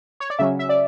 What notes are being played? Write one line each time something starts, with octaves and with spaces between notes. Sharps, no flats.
C#5
D5
C#3 F#3 C#4 E5
E5
D5